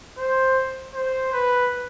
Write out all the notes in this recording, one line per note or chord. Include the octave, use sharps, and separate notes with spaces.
C5
C5
B4